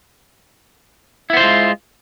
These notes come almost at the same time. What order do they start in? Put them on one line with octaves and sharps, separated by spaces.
E4 B3 C5 F4 G#3